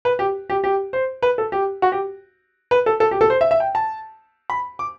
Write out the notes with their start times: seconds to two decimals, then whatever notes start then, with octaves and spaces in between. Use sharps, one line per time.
0.05 B4
0.19 G4
0.50 G4
0.64 G4
0.93 C5
1.23 B4
1.38 A4
1.52 G4
1.82 F#4
1.92 G4
2.71 B4
2.86 A4
3.00 A4
3.11 G4
3.21 A4
3.30 C5
3.41 E5
3.51 E5
3.60 G5
3.75 A5
4.50 B5
4.79 D6